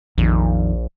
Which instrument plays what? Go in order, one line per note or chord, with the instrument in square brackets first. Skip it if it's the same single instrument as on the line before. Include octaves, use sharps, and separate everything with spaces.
[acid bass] A#1 [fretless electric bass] F2 D#3